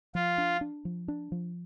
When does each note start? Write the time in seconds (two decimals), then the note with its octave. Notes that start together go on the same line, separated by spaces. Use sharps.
0.15 F3 F4
0.38 D4
0.61 D4
0.85 F3
1.08 D4
1.32 F3